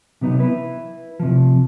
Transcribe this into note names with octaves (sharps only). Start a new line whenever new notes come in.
C3 F#3 B3 D#4
E4 B4
C3 F3